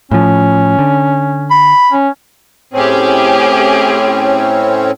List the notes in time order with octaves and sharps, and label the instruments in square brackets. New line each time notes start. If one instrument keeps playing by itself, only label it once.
[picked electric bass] A2 F3 [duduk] C#4
[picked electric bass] D3
[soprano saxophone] B5
[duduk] C#4
[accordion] A2 C4 C#4 [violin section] G4 G#4